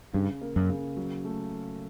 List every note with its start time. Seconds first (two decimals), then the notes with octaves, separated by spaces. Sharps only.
0.13 G2 C#3
0.41 A#3
0.56 F#2
0.70 C#3
0.97 F#3
1.25 A3